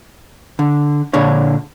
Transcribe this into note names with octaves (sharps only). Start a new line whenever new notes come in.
D3
A#2 D3 D4 C#5